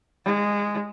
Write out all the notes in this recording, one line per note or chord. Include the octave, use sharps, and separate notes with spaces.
G#3